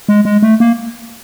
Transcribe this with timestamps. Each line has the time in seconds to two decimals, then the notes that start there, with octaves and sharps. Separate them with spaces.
0.09 G#3
0.25 G#3
0.42 A3
0.60 A#3